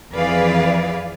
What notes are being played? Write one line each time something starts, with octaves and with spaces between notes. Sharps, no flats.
F2 E3 G#4 B4 D5 F5